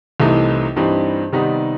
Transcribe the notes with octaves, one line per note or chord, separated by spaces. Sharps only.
C2 C3 E3 A3 D#4
G2 E3 G3 C4 D#4
C3 D#3 G3 B3 D#4